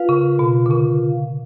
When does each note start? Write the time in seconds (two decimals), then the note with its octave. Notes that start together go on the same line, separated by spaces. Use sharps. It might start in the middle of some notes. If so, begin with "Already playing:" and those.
Already playing: F4 B4 F5
0.09 C#3
0.39 B2
0.66 D3
0.71 C#3